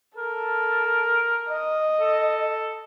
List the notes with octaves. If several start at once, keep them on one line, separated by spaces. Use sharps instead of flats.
A4 A#4
D#5
A4